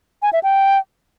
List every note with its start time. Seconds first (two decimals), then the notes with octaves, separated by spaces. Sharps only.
0.22 G#5
0.33 E5
0.43 G5